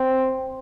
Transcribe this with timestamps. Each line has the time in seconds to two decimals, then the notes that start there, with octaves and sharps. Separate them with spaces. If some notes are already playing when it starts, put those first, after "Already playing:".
Already playing: C4